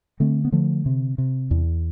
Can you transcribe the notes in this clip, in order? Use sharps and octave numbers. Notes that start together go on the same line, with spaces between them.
D3 A3 C4
B3
D3 F3 A3
C3
C3
E2